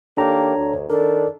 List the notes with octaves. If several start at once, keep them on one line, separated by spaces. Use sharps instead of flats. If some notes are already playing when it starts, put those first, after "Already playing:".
D#3 A#3 D4 G4 A4 C#5 A#5
D2
D#3 D4 A4 A#4